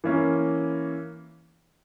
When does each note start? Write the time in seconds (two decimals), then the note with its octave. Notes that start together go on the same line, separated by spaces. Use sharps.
0.04 E3 A#3 C#4